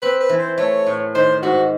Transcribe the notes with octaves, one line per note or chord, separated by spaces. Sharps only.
C4 B4
B4
E3
C5
A3 C#5
A2
D#3 C5
G#2 F#4